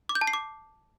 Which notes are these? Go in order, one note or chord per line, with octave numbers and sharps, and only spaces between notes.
D6
G6
A5
C7
D6